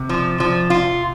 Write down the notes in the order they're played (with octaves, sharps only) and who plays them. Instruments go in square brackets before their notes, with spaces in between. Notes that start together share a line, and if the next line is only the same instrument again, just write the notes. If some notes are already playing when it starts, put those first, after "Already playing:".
Already playing: [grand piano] C3
[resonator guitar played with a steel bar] F3
F3
F4